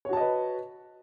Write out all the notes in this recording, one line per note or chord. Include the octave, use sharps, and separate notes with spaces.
F#4 B4 C#5 D#5 A5